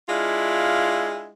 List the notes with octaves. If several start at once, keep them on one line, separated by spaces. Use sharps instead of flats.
G#3 D4 E4 F4 F5